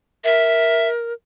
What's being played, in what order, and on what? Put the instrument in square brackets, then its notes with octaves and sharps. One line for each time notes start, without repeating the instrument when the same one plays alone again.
[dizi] A#4 [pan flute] E5